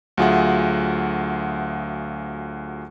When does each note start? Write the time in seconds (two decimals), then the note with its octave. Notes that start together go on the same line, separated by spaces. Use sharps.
0.18 D2 F#3 F4 G#4 E5 F#5